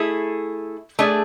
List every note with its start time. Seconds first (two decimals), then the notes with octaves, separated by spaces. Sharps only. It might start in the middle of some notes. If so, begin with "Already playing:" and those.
Already playing: A3 E4 G#4
0.99 A3 D4 G#4 D5